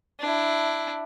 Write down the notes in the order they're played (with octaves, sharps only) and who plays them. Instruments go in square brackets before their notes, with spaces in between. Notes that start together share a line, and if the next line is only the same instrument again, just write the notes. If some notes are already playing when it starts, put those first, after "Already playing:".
[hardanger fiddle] D4 E4